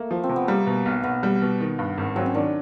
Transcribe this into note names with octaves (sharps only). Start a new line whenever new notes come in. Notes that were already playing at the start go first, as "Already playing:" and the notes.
Already playing: A3 A#3
F3
C4
C3
B3
G3 A#3
B2
B1
B1 B3
G3
B2
D#3
G2
G#1
F#3 C4
C#4
D#3 D4